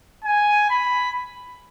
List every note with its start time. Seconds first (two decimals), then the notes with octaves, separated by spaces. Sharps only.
0.25 G#5
0.70 B5